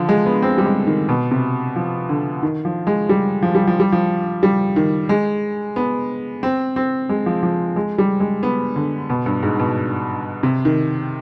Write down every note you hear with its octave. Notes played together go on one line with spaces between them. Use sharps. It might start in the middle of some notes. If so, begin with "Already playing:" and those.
Already playing: D3 F3
G#3
B3
C4
G3
G#3
D#3
B2
C3
F3
D3
D#3
F3
G#3
G3
F3
G3
F3
G3
F3
G3
D#3
G#3
B3
C4
C4
G#3
F3
F3
G#3
G3
G#3
B3
D3
B2
G2
G#2
B2
C3
D#3